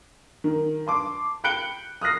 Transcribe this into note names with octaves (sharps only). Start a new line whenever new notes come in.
D#3
A5 C6 D6
G5 B5 F#6 C#7 D7 G7
D#6 F6 F#6 A#6 C7